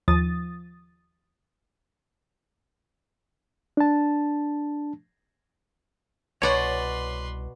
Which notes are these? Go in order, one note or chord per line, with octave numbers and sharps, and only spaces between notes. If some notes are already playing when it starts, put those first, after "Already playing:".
D#2 F3 D#6 A6
D4 A5
C2 B2 B4 C#5 D5 F#5 C6